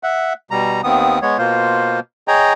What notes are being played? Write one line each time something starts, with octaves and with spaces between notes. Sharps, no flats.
E5 F#5
B2 G3 A#5
D#2 D#3 B3 C4 D#6
G#3 B3 C#5
B2 A#3 F4 C5
G#4 C#5 D#5 G5 A#5